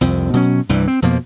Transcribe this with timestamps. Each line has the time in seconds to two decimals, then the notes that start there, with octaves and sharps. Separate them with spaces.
0.01 C2 F2 C4
0.33 B2 F#3 C4 C#4
0.69 C2 G2 E3 G3
0.88 C4
1.02 F2 B2 F3 A#3